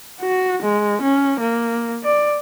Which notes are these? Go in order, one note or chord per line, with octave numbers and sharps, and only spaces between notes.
F#4
G#3
C#4
A#3
D5